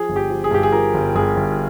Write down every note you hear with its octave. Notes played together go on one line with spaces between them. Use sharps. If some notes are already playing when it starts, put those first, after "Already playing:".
Already playing: F3 G#4
G1
G4
F3
G#4
G2 G4
G#4
F3 A#4
G1
G1 G#4
G1